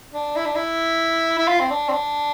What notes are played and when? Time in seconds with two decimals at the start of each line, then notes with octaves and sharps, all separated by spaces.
0.14 D4
0.36 E4
0.45 D4
0.55 E4
1.38 E4
1.48 F4
1.60 C4
1.70 D4
1.88 C4
1.92 D4